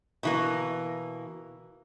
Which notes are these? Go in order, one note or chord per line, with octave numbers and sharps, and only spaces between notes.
B2 E3 A#3